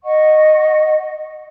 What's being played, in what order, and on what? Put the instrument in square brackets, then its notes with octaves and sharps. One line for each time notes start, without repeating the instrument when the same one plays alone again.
[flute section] D#5 F#5 C#6